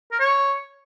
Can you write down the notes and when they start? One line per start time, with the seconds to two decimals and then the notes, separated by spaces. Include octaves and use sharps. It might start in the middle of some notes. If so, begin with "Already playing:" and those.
0.12 A#4
0.20 C#5